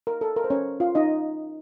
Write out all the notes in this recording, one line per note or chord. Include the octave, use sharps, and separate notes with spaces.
A#4
A4
A#4
C5
C#4 C#5
F4 F5
D#4 D#5